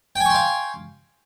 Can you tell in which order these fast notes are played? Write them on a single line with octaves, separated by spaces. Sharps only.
G5 G#5 C#6 C6 F5